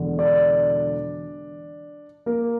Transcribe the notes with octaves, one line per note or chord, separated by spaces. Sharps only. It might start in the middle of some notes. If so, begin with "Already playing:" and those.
Already playing: E1 E2 D3
D4 D5
A#3 A#4